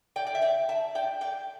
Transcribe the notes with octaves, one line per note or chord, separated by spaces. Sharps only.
D5 G5
D5
E5
D5 G5
E5 A5
D5 G5
D5 G5